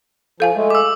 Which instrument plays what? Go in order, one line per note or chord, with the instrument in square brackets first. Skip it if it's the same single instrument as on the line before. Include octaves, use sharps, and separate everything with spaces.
[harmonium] F3 [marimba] A4 F5 G#5
[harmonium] G#3 A3
[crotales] D6 E6